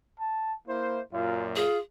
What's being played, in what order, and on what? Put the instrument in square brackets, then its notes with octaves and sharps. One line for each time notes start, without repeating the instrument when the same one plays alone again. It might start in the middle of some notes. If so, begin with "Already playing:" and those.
[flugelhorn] A5
[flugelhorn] A#3 [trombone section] E4 C5
[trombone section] F#2 A#2 [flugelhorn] F4
[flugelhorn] F4 [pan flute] G#4